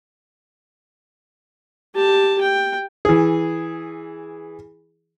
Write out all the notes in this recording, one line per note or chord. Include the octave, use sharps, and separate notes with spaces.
G4 A5
G5
E3 G#4